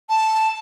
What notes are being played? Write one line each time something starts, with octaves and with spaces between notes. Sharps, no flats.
A5